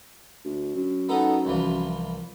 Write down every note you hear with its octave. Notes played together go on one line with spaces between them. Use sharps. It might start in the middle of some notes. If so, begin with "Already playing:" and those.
D2
F#2
B3 D#4 A4
C2 E3 F3